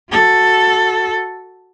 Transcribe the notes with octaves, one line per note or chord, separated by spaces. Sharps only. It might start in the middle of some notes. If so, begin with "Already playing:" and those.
F#4 A4